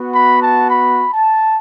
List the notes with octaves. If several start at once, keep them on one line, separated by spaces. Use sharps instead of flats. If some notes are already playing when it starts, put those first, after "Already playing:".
Already playing: B3 F#4
B5
A5
B5
A5